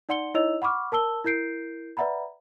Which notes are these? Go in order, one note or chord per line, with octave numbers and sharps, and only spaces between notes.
D#4 D5 F#5 C6 C#7 G7
D#4 E4 C#5 D#5 E6 F7
F#5 B5 C#6 D6 F6
A#4 A5 E6 G7
E4 A#4 G6 C7 D7
B4 D5 E5 F#5 A#5 B5